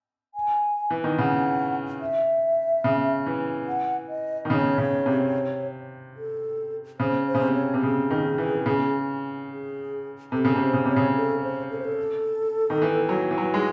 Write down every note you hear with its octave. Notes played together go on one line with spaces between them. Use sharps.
G#5
E3
D#3
C#3 F#5
E5
C#3
E3
F#5
D#5
D#3
C#3 C#5
C#3
C3
A4
C#3 C5
C5
C#3
C3
C#5
C3
C#3 G#4
D#3
E3
C#3
G#4
C3 A4
C#3
C3 C5
C#3
C3 C#5
C#3
A4
C5
A4
C5
A4
D#3
E3
F#3
E3
F#3
G#3